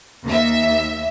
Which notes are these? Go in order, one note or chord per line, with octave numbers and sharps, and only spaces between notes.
D#2 E5